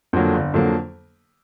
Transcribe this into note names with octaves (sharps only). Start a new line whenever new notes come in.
F2 D3 F#3 A#3
G1
F2 D3 F#3 A#3